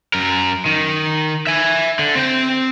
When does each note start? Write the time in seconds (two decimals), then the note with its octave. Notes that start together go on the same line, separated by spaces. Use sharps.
0.14 F#2 A#4
0.66 D#3
1.47 E5 G#5
1.99 D3
2.15 C4 G5